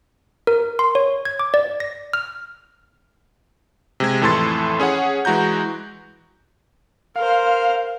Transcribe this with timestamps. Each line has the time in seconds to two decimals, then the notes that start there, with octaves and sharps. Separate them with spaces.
0.47 A#4
0.79 C6
0.95 C#5
1.25 G#6
1.39 D6
1.54 D5
1.80 A#6
2.13 F6
4.00 C3 G#3 G#6
4.21 F2 A2 E3 A4 C6 A6
4.80 C#4 G#4 C#5 F#5
5.25 E3 G#3 F#4 A#5 G6
7.16 A#4 C5 F5